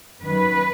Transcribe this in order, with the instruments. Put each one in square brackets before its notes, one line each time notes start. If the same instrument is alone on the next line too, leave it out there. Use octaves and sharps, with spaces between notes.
[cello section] F#2 D#3 F#3 B4